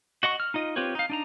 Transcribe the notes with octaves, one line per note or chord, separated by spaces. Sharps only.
F#4 D#5 F#5 C#6
F6
D#4 F4 D#5
C4 F4 G4 B4 C#5
D#4 F5
D4 D#4 A#5